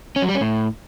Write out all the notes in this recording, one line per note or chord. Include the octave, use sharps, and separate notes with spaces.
C#4
F#3
G3
C#4
A2